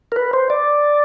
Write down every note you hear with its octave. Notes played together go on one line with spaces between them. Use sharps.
A#4
B4
C5
D5